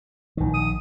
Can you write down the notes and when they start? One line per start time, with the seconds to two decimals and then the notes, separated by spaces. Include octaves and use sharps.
0.37 A#1 D#3
0.54 D#6